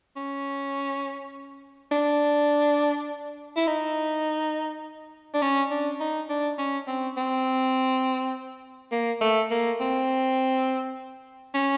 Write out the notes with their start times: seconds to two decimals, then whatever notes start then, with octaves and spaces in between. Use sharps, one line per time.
0.16 C#4
1.91 D4
3.56 E4
3.67 D#4
5.34 D4
5.42 C#4
5.71 D4
6.00 D#4
6.30 D4
6.58 C#4
6.88 C4
7.17 C4
8.92 A#3
9.21 A3
9.51 A#3
9.80 C4
11.55 C#4